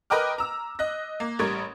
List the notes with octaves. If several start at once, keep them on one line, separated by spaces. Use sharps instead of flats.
A#4 B4 D#5 G5 D6 F6
A#5 E6
D#5 F#6 A#6
A#3
A1 G3 A#4 C#6 G#6